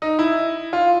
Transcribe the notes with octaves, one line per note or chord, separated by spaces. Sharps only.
D#4
E4
F4